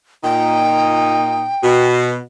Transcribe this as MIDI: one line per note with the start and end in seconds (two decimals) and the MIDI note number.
0.24 1.48 46
0.24 1.48 63
0.24 1.87 79
1.64 2.17 47